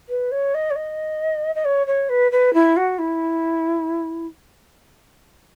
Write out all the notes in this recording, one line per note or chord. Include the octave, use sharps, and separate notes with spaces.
B4
C#5
D#5
C#5
D#5
D#5
C#5
C#5
B4
B4
E4
F#4
E4